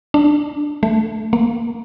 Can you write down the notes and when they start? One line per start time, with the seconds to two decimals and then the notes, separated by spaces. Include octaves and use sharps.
0.14 D4
0.83 A3
1.33 A#3